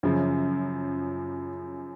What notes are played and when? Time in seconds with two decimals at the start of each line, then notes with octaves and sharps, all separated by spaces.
0.03 F#2 C#3 F3